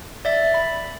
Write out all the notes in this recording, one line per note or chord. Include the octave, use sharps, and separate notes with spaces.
D5 E5 A6
B5